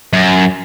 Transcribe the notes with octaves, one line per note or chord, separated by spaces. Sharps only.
F#2